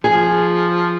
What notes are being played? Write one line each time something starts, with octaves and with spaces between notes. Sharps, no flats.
F3 G#4